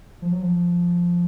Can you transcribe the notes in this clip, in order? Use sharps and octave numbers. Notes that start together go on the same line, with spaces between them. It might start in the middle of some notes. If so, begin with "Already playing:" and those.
F3
F#3
F3